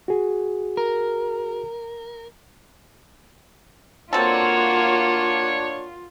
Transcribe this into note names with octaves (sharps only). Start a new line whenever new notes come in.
F#4 G#4
A#4
A#3 C4 D4 F4 F#4 A4 C#5